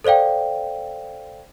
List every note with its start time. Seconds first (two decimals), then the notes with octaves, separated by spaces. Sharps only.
0.04 A4 C5 D5 F5 G5